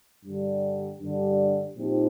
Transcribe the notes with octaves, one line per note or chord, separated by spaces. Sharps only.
G2 D3 G3
G2 D3 G3 D4
A#2 F3 C4 D#4 G4